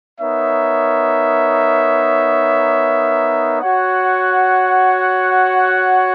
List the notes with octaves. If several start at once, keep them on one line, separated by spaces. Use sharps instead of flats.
B3 D#4 A#4 C#5 E5
F#4 C#5 F#5